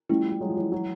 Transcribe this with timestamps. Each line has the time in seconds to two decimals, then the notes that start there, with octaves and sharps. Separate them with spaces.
0.09 F3 G3 A3 C#4 E4
0.29 G3
0.41 F#3 G#3
0.49 F3
0.56 E3 F#3
0.72 E3 F#3